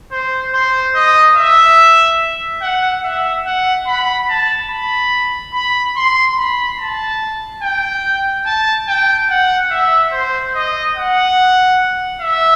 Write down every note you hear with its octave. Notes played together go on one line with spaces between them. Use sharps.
C5
C5
D#5
E5
F#5
E5
F#5
B5
A5
B5
B5
C6
B5
A5
G5
A5
G5
F#5
E5
C5
D#5
F#5
E5